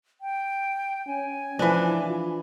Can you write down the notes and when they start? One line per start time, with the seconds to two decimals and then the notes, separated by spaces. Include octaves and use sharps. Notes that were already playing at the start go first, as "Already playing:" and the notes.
0.21 G5
1.07 C#4 G#5
1.59 E3 F3 D4
2.09 F4